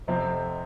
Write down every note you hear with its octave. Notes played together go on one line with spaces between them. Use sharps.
F1 F2 C3 F3 C4